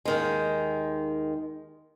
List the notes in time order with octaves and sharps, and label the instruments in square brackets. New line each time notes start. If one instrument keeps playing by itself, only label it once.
[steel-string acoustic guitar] D#2 D#3 G#3